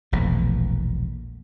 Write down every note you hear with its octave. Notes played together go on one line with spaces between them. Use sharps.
E1 A#1 A2